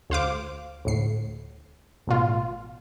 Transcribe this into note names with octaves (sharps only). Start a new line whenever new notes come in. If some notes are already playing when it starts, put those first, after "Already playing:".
D2 C5 F5 D6
D2 A2 C7
A1 B2 F4